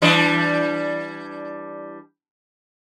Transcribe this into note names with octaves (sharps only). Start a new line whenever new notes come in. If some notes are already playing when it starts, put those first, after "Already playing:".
E3 G3 D4